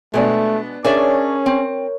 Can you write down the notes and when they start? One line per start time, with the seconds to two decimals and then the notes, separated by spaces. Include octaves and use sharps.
0.14 B2 G#3 A3 B3 D4
0.84 C#4 D4 G#4 A#4 C#5 D5 E5
1.46 C4